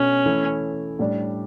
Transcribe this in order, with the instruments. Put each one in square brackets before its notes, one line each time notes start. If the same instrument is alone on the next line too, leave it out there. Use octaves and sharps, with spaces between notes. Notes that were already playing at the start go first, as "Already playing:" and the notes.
Already playing: [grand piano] B2 A3 D4 [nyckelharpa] C#4
[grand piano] E3 A3 E4
A2 G3 D4